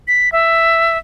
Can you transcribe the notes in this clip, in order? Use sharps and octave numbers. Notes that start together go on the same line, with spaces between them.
B6
E5